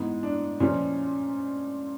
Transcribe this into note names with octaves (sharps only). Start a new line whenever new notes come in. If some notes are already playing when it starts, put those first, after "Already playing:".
Already playing: G#2 E3 B3
D4
A#2 F3 C#4